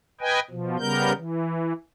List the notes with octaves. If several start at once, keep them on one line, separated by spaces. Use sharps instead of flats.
B4 D#5 G5 G#5
B2 F3
C#3 G3 B3 A#4 G6
E3